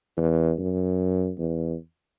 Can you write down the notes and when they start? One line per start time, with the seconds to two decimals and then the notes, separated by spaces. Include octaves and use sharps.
0.17 E2
0.59 F#2
1.39 E2